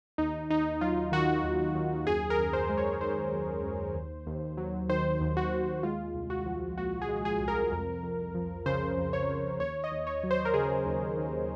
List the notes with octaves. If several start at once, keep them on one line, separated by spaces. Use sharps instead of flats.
D#2 D#4
D#2 D#4
F#3 F4
D#3 F#4
D#2
D#2
F#2 G#4
A#4
F#2
C5
G#3
C#5
D#3 C5
F#2
F#2
D#2
D#2
F#3
D#3 C5
D#2
F#4
D#2
G#3 F4
C2
F#4
F3
A#2 F#4
G#4
G#3
G#4
C2
A#4
F2
F2
F3
C#3 C5
F2
C#5
F2
D#2 C#5
D#5
D#2
C#5
F#3
C5
A#4
C#3 G#4
D#2
D#2